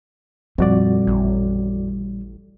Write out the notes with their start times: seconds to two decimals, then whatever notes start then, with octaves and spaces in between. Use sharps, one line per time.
0.58 F2 A#2 G3 F#4 D5
1.07 A1